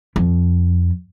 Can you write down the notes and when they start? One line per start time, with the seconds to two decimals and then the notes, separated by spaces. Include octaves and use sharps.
0.16 F2